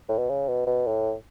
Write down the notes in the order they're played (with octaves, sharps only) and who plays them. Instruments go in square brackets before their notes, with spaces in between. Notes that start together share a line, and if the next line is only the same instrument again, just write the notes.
[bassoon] A2
B2
C#3
B2
B2
A2